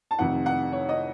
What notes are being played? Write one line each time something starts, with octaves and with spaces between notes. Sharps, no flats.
A5
F1 F2 C3 D#3 F#5
F#5
C#5
D#5